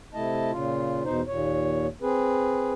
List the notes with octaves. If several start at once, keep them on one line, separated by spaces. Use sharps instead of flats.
C3 A3 E4 D#5 A5
A#2 C#3 F4
E2 B2 D#4 C5
D#2 A#2 C#5
C4 G#4 B4